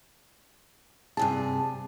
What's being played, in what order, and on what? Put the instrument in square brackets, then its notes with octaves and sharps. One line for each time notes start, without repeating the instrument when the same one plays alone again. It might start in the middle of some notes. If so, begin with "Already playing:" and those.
[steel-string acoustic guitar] G2 C3 G#4 [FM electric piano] A5